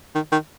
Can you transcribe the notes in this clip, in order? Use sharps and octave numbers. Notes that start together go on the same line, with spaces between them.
D#3
D#3